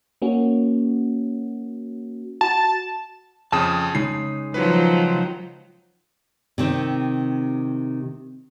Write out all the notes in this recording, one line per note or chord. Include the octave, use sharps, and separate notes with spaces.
A#3 C#4 F#4
F#4 A5
F2 C#3 A5 D#6
C#3 G#3 D#4 C7
D#3 F3 F#3 B4
C3 D#3 C4